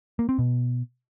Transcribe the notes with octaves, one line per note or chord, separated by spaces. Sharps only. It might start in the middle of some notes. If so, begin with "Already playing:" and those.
A#3
C4
B2